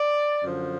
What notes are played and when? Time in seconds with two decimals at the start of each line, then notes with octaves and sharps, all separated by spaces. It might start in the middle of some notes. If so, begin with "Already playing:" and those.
Already playing: D5
0.41 F#2 D3 F3